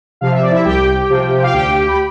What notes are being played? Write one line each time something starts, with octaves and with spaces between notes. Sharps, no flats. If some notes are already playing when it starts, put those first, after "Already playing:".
C3 F3 F5
E5
D5
E4 E5
C2 G4 G5
C3 F3
F5
D2 G4 G5
B5